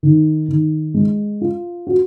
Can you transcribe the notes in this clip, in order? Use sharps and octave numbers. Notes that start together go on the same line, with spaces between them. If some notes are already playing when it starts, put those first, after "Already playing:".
D#3
D#3
G#3
F4
F#4